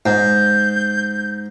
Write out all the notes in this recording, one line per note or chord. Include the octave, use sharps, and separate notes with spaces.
G#2 G6